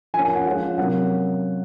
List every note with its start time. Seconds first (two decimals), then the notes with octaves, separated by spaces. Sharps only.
0.14 F3 G#5
0.16 A#3 C#4
0.25 G#5
0.35 F#5
0.46 F3 G#3 C#4 F#5
0.78 C3 F#3 A#3 C#4 F#5